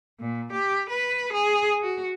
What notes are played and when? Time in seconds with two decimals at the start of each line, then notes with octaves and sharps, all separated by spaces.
0.20 A#2
0.52 G4
0.90 B4
1.33 G#4
1.82 F#4